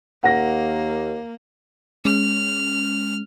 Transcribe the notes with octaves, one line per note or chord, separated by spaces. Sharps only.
D#2 A#3 F#5 A#6
G#3 C#4 F6